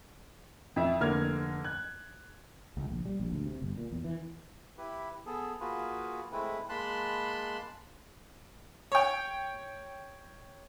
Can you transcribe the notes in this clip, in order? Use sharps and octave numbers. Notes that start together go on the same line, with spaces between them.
F2 E5
F1 D3 A#3 F6 G#6
F#6 G#6
C#2
A#1
G3
A#1
D2
C3
G1
A#2
E2
E3
E4 G4 B4
B3 G#4 A4
A#3 F4 F#4 G#4 B4
G#3 A3 C4 E4 B4
G#3 A#3 A5 B5 C6 F#6
C#5 G5